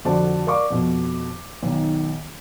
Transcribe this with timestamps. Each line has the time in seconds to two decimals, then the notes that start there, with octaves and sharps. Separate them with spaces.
0.05 F2 D3 F#4 C5 D5 A5
0.47 A#4 D5 F5 C#6 D6
0.70 F2 B2
1.63 B1 D#3